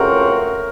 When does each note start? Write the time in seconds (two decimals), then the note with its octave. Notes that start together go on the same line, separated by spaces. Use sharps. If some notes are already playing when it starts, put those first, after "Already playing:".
Already playing: C#2 C#3 A3 C4 F#4 A#4